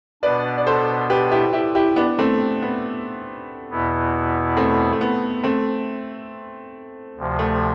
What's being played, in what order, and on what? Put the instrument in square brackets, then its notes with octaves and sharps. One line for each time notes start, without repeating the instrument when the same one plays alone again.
[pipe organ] B2 B3 D4 [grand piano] B4 D5
[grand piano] D5
A4 C5
G4 B4
E4 G4
E4 G4
E4 G4
B3 D4
A3 C4
B3
[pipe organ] E2 B2 B3 E4
[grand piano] A3 C4
A3
B3
A3 C4
[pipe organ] D2 C3 F3
[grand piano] A3